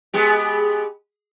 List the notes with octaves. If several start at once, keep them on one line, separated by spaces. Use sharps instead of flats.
G#3 B3 G4